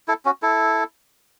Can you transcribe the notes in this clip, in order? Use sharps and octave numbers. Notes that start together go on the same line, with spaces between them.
E4 A4
C#4 F#4
E4 A4